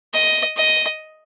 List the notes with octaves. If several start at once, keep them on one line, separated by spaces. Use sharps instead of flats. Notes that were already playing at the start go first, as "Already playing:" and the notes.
D#5
D#5